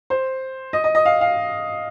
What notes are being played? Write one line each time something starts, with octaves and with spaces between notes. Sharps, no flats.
C5
D#5
D#5
D#5
F5
F5